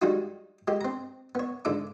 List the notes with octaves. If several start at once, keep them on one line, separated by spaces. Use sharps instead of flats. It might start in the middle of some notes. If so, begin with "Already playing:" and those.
G3 G#3 D#4 F#4
G#3 G4
C4 A#5
B3 C#5
G#2 D3 A4 D6